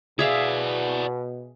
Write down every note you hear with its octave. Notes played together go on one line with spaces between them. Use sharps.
B2 E4 G#4 D5 E5 F5